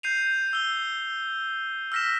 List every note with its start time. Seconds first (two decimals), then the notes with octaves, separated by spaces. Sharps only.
0.03 G6 C7 D#7 F7
0.53 E6 G7
1.92 E6 F6 A#6 B6 E7